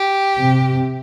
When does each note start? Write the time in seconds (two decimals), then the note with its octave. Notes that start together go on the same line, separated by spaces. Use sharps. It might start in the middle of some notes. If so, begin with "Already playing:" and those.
Already playing: G4
0.38 C3